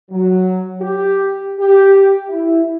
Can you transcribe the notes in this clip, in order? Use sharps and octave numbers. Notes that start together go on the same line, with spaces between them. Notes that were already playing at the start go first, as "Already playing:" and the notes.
F#3
G4
G4
E4